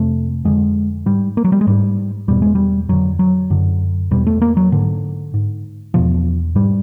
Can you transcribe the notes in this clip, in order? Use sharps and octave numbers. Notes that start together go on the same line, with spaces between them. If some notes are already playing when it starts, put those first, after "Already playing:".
Already playing: F2 C3 A3
F2 D3 G#3
G#2 G3
A#3
F#3
G3
G#3
G#2 G3
E2 B2 G3
G#3
G3
F2 D3 F#3
F#3
F#2 D3
E2 B2 G3
A3
A#3
F#3
G#2 D3
G#2
E2 B2 F3
G#2 G3